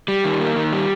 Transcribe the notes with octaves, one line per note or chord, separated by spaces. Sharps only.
G3
D#3
A#3
D#3
G3